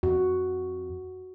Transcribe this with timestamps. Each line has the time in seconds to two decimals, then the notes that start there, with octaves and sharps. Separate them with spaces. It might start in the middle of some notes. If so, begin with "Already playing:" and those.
0.03 F2 F#4